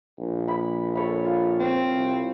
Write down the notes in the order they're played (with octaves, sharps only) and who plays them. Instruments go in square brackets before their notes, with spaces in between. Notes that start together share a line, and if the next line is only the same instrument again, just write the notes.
[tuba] A#1
[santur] B5
A4 C#5 B5
F4
[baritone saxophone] C4
[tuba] C2